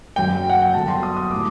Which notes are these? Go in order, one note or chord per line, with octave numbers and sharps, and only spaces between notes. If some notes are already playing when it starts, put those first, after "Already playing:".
F#1 F#2 F#3 G5
F#5
G5
G1 F#2 F#3 A5
C6
D#6
D#6
A2 G3 D6